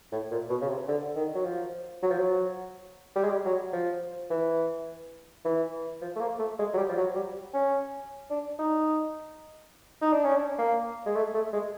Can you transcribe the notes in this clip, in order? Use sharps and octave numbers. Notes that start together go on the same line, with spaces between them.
A2
A#2
B2
C#3
C3
D3
D#3
F#3
F3
F#3
F3
F#3
G3
G#3
G3
F#3
F3
E3
E3
F3
A3
A#3
A3
G#3
F#3
G3
F3
F#3
G3
C#4
D4
D#4
D#4
D4
C#4
D4
A#3
G#3
A3
A3
G#3